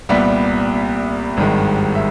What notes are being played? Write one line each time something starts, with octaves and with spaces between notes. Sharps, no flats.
C2 A#2 G3 B3 E5
G#1 G2 D#3 G#3
E5